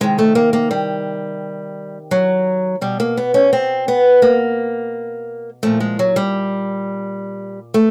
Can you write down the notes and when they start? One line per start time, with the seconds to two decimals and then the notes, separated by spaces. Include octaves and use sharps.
0.01 C3 D#3 G#3
0.18 A3
0.35 A#3
0.53 A#3
0.71 G3
2.11 F#3
2.81 B2 G3
3.00 A#3
3.17 B3
3.34 C#4
3.53 C4
3.88 B3
4.22 A#3
5.63 A#2 F3 A3
5.80 G#3
5.99 F#3
6.16 G3
7.74 A3